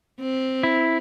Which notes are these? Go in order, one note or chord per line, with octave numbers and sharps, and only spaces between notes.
C4
E4